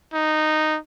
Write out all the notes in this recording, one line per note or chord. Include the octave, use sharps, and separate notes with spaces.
D#4